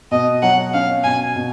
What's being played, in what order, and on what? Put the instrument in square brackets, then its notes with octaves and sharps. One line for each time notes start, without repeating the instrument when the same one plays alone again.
[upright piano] B2 [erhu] D#5
[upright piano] F#3 [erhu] F#5
[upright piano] C#4 [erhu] F5
[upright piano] B2 [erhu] G#5
[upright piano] B2